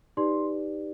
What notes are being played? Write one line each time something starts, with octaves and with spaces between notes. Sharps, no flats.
D#4 G4 B4 D5 C6